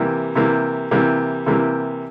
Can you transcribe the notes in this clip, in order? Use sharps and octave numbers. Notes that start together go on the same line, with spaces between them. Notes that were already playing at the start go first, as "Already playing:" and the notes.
Already playing: C3 E3 G3 A#3
C3 E3 G3 A#3
C3 E3 G3 A#3
C3 E3 G3 A#3